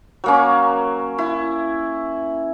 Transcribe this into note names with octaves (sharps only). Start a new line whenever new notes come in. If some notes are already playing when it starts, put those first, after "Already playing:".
F#3 A#3 C#4
E4